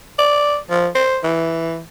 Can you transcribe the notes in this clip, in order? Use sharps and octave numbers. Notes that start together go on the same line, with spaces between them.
D5
F3
C5
E3